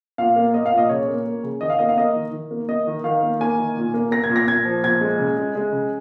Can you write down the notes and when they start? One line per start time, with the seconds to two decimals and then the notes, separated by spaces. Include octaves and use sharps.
0.18 A#2 F5
0.36 A#3
0.54 A#3 D#5
0.66 F5
0.72 A#2
0.78 D#5
0.89 C#3 C#5
1.08 A#3
1.26 A#3
1.43 C#3
1.61 D#3 D#5
1.70 F5
1.79 A#3 D#5
1.89 F5
1.97 A#3 D#5
2.15 D#3
2.32 D#3
2.51 A#3
2.68 A#3 D#5
2.87 D#3
3.04 D#3 F5
3.23 A#3
3.40 A#3 G#5
3.59 D#3
3.77 A#2
3.94 A#3
4.11 A#3 A#6
4.24 G#6
4.29 A#2
4.36 A#6
4.47 A#2 G#6
4.65 F3
4.84 A#2 G#6
5.01 G#3
5.19 C#3
5.37 G#3
5.55 G#3
5.72 C#3